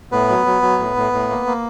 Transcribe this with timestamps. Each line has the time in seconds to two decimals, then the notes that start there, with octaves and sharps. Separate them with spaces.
0.11 A2 B3 B4
0.29 F#3
0.46 F#3
0.62 F#3
0.79 A2
0.97 A2
1.13 A2
1.29 A#3
1.46 A#3